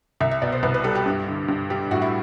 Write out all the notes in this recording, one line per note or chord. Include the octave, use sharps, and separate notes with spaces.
C2 E5
E5
B2 D5
C5
C2 B4
B4
G3 A4
G4
G2
D3
G2
G3
A2 F#4
E4